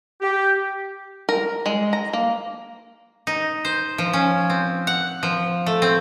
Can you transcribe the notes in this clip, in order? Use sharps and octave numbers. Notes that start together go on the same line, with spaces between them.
G4
A#4
G#3
A#5
A#3
D#4
C5
F3
C#4
C4
F#5
F3
A3
C4